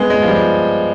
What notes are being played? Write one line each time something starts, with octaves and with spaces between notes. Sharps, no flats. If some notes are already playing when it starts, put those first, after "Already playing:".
Already playing: G#3 B3
G#3
F3
G3